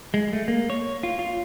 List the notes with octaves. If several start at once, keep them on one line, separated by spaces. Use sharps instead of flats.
G#3
A3
A#3
C#5
F4
F4